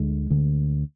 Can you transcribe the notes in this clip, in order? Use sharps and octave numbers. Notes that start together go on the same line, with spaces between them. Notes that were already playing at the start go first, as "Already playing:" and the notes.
Already playing: D2 D3 G#3
D2 D3